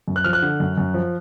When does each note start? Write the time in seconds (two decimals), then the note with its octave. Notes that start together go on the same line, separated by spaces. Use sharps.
0.08 F#2
0.16 F#6
0.24 F3 F6
0.33 F#6
0.42 D3
0.60 F#2
0.78 F#2
0.94 F3